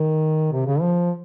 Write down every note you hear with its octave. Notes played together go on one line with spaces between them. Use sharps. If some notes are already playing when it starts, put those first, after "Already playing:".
Already playing: D#3
C3
C#3
F3